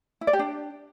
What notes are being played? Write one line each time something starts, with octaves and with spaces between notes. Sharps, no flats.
E4
D5
G4
D4